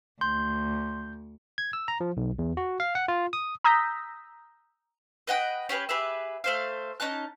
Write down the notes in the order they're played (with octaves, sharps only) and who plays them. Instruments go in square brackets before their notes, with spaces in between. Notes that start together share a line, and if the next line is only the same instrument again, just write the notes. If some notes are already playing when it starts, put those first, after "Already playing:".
[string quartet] D2 [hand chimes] C6 [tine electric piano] G6
[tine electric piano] G#6
E6
A#5
F3
B1
E2
F#4
F5
F#5
F4
D#6
[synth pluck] A#5 D#6 E6 G6 A#6 B6
[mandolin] B4 D#5 F#5 G5
C#4 G4 G#4 B4
G4 G#4 B4 E5
A3 C5 F5
C#4 D#4 A5 F#6